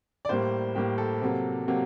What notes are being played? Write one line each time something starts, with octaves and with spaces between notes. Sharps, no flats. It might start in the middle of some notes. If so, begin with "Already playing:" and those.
D5
A2 G3 A#3 C5
A2 G3 A#3 G4
A4
C3 F#3 A#3
C3 F#3 A#3